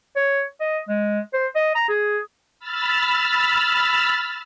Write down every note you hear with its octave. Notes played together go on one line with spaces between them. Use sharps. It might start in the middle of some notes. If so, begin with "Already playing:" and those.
C#5
D#5
G#3
C5
D#5
A#5
G#4
B5 E6 F6 A6